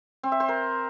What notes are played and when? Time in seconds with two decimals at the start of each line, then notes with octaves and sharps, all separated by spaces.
0.23 C4
0.32 E5
0.40 C5
0.48 A#4